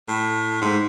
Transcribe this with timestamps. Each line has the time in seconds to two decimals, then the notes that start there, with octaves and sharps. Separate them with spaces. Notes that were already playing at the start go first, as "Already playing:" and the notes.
0.08 A2
0.62 G#2